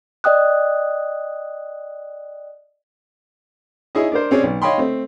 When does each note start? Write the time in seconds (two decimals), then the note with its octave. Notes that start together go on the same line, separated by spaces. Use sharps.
0.24 D5 D#5 G5 D#6 F#6
3.95 D#4 E4 G#4 C#5 D#5
4.12 D4 A#4 C5
4.31 C4 C#4 G#4 D5
4.43 B1
4.62 C#5 D#5 F5 G5 B5 C6
4.78 A3 C4